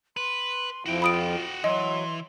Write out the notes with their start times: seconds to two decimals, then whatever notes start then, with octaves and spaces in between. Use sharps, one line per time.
0.17 B4 C6
0.86 F2 E4 F#4 G5
1.02 F4 B5 D#6 D7
1.64 E3 F#3 D#5 C6